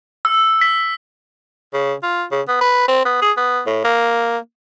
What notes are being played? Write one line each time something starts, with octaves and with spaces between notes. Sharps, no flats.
E6
B6
C#3
F4
C#3
B3
B4
C4
B3
G#4
B3
A2
A#3